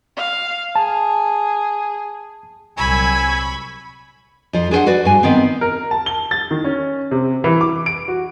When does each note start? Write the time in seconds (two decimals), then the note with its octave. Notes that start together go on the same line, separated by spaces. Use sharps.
0.17 F5
0.75 G#4 A5
2.77 C2 A#2 F#3 G#5 B5 C#6 E6
4.53 F2 F3
4.71 D4 G#4 A4 C5 F#5
4.86 F#4 B4 D5
5.05 G2 G#5
5.23 D#3 B3 C4
5.61 A#4
5.91 A5
6.06 G7
6.31 A6
6.51 D#3
6.64 C#4
7.11 C3
7.44 E3
7.61 D6
7.86 D7
8.08 F#4